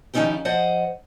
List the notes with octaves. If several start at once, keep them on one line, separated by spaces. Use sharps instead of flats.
D#3 F3 C#4 D#4 E4 G4
F3 C5 D#5 F#5